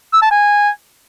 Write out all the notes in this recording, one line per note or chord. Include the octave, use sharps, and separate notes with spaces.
E6
A5
G#5